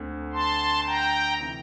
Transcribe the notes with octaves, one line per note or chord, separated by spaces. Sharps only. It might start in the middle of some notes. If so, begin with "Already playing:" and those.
Already playing: D2 D3 C4
A5 C6
G5 A#5
C3 E3